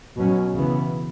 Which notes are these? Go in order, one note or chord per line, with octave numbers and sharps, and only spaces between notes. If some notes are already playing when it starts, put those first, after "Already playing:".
B2 F#3 C#4
C#3 E3 B3